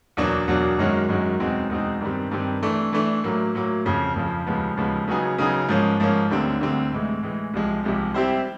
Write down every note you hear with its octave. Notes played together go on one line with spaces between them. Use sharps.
E2 B2 F#3 A#3 D4
E2 B2 F#3 A#3 D4
F#2 D#3 G#3 C#4 F#4
F#2 D#3 G#3 C#4 F#4
E2 B2 G#3 C4 D#4
E2 B2 G#3 C4 D#4
G2 D#3 G3 C4
G2 D#3 G3 C4
E3 A3 D4
E3 A3 D4
A2 F#3 A#3
A2 F#3 A#3
F2 C#3 F3
F2 C#3 F3
D#2 C#3 F3 G#3 B3
D#2 C#3 F3 G#3 B3
C#3 F#3 B3 D#4 G#4
C#3 F#3 B3 D#4 G#4
G#2 F3 A#3 C#4
G#2 F3 A#3 C#4
D2 D3 G3 C4
D2 D3 G3 C4
A2 E3 G#3
A2 E3 G#3
C2 C3 F3 G#3
C2 C3 F3 G#3
G3 C4 E4 G4 C5